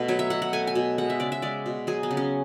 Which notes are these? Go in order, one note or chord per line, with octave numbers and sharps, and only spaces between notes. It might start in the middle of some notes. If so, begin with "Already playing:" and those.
Already playing: B2 A3 B4
F#3 C#5
E5
B2 F#5
F#5
A3 G#5
G#5
B2
G#3 F#5
E5
C#3 D5
E5
G#3 D5
B2
F#3 G#4
B3
C#3
C#4